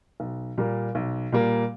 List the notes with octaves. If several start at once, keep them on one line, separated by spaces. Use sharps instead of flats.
B1
A#2 G3 A#3
B1
A#2 G3 A#3